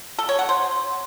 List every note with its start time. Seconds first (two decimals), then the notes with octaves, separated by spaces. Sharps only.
0.19 A4
0.29 C#5
0.39 F#5
0.49 C5